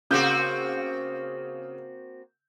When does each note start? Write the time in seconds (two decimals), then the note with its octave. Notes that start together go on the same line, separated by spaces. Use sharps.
0.11 C#3 A#3 C4 F#4 G6